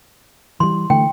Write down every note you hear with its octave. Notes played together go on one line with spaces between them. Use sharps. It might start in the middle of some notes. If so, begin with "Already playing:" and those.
E3 G3 C6
D3 E3 A3 G5